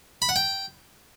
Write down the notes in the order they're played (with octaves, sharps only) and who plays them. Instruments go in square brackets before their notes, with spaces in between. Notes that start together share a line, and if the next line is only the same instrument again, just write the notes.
[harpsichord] B5
F#5
G5